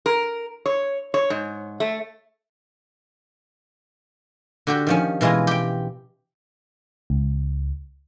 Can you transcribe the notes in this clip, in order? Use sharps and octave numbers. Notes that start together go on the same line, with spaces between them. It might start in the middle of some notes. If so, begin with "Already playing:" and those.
A#4
C#5
C#5
G#2
A3
D3 F#4 G4
D#3 F3 C#4
B2 E3 G#3 F4 A#5
G4 G5
C#2